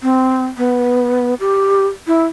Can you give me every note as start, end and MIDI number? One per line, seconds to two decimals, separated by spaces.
0.02 0.45 60
0.57 1.34 59
1.40 1.86 67
2.07 2.25 64